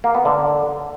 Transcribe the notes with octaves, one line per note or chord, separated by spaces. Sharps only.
A#3
B3
D3